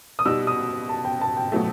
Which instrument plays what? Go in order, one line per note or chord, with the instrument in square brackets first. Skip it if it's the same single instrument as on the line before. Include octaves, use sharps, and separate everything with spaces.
[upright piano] D#6
[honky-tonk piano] B2 G3 D#4 [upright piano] E6
[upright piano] D#6
A5
G5
A5
G5
[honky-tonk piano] B2 F#3 A3